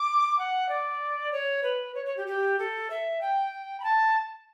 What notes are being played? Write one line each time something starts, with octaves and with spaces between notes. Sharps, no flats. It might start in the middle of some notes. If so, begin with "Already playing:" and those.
Already playing: D6
F#5
D5
C#5
B4
C#5
C#5
G4
G4
A4
E5
G5
B5
A5